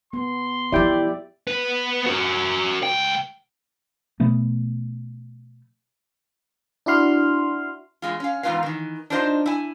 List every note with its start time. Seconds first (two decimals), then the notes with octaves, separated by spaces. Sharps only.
0.13 B3 C6
0.72 E3 F3 E4 G4 D5 E5 G5
1.47 B3 B4
2.06 F#4 A#4
2.83 C#2 G5
4.20 B2 F3 A3 B3
6.86 D4 E4 F#4 C6 F6
8.02 E2 A#2 G#3 F4
8.20 C#4 F5
8.43 E2 G#2 D#4 F4 B4 F5
8.63 D#3 E3
9.10 D4 D#4 F4 C5 C#5 D#5
9.46 E4 G#5